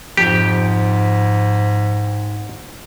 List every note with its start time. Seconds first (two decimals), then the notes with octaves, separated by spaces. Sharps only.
0.17 F2 G#2 G4